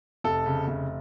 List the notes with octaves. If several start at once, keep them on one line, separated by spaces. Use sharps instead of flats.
F1 A4
C#3
F1